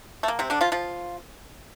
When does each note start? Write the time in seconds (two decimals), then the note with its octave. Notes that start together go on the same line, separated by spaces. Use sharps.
0.23 A3
0.28 A#3
0.39 C3 C4
0.50 D3 D4
0.61 F3 F4
0.72 F3 F4